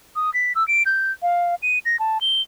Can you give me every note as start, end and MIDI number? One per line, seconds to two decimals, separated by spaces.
0.16 0.33 87
0.34 0.53 95
0.55 0.66 88
0.68 0.83 98
0.86 1.12 91
1.23 1.55 77
1.62 1.79 99
1.85 1.99 94
1.99 2.18 81
2.21 2.41 103